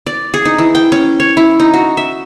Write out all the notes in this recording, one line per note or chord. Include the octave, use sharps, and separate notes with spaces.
D5
G#4
D#4
E3
G5
C#4
C#5
E4
D#4
F#4
E5